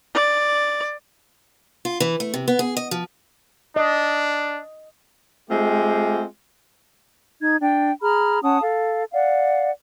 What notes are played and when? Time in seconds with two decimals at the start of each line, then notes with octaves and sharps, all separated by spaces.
0.14 D5
1.85 F4
2.00 E3
2.20 A3
2.34 C3
2.48 B3
2.59 G#4
2.77 D#5
2.91 F3
3.76 D4 D#5
5.50 G#3 A3 C4 F4 G4
7.41 D#4 G#6
7.60 D4 G5
8.02 G#4 A#5 B5 F6
8.43 C#4 F#5 A5 D#6
8.62 A4 F5
9.12 D5 F5 F#5